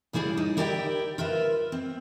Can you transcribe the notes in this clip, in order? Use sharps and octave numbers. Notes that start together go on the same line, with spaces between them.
C#3 G3 E4 G#4 D5
D#4
E4 G4 A#4 D5 D#5 G5
F4 A#4 B4 E5
C4